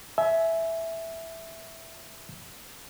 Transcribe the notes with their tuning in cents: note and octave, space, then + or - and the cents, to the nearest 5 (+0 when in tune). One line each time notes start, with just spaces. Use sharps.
E5 +0 G#5 +25